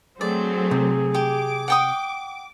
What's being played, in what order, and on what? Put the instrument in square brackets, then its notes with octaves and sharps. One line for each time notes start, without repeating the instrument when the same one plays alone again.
[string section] F#3 A3 C4 [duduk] G#4 [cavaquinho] D5
[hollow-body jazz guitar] C3
[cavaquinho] G4 [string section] D6
[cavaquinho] F#5 G5 D#6